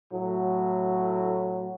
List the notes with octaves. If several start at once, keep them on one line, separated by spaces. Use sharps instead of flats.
A2 F#3